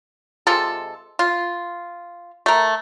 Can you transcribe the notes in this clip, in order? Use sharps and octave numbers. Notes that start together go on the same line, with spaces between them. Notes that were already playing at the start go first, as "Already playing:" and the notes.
C3 G#3 F4 A4
F4
A3 A#4